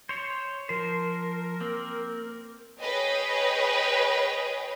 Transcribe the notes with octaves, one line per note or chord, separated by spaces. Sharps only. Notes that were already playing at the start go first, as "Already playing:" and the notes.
C5 C#5
F3 A#4 C5
A#3 C4
G#4 B4 C#5 D#5 G5